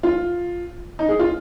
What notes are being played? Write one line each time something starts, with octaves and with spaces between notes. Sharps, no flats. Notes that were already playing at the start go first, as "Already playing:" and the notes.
F4
D#4
G#4
F4